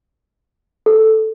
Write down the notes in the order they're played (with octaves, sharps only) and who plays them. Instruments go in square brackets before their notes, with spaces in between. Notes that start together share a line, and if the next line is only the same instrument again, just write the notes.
[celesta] A4